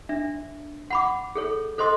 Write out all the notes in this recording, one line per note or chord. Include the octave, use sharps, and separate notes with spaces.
D4 E5
F#5 B5 D6
G#4 A4 C#5
A4 C5 D#5 C6 D#6